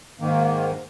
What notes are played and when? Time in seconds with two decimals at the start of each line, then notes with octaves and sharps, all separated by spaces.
0.20 G#2 D#3 A#3